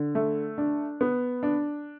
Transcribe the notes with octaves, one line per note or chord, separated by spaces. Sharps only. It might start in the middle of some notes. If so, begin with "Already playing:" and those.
Already playing: D3
A3
D4
B3
D4